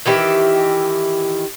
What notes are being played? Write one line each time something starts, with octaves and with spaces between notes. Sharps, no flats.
D#3 E3 G4 E5